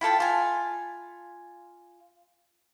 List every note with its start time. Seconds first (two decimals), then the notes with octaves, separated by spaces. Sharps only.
0.01 E4 F4 A4 G5
0.20 F4 G#5